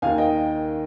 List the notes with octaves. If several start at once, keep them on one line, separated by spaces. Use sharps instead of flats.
D#2 D#3 F5 G#5
D#5 G5